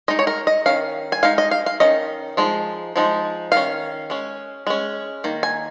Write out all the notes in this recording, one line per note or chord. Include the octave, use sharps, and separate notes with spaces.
G#3 D#4 D#5
C#5
A#4
D#5
D#3 C#4 F5
G#5
G#3 D#4 F5
D#5
F5
F5
D#3 A#3 C#4 D#5
F3 G#3 D#4
F3 G#3 D#4
D#3 C#4 F5
G#3 C#4
G#3 C#4
D#3 A#3
G#5